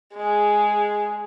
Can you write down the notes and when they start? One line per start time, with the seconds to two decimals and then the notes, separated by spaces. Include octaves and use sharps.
0.14 G#3 G#4